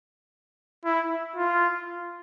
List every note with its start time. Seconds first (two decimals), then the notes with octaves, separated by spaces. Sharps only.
0.85 E4
1.36 F4